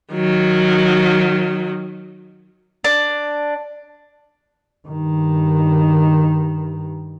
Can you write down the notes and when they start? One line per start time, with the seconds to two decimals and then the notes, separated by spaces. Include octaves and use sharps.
0.14 D#3 F#3
2.84 D4
4.88 G2 D#3